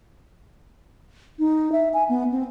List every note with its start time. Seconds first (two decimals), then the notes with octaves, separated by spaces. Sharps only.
1.39 D#4
1.72 E5
1.94 G#5
2.09 B3
2.32 C4